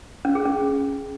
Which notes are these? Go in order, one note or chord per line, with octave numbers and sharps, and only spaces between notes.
C#4
G#4
C#4